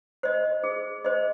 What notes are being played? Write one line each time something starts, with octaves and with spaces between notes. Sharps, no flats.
C5 D#5
G#4
C5 D#5